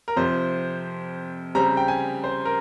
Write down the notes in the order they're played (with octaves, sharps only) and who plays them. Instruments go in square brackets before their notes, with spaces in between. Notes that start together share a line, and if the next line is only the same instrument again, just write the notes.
[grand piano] A#4
F2 C3 F3 C5
C#3 G3 C4 A#5
G5
G#5
C5
A#4